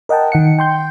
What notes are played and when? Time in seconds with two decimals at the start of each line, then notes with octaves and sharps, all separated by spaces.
0.09 A#4 D#5 F#5 G5 A5
0.32 D#3 F#5 C#7
0.59 G5 C6 G6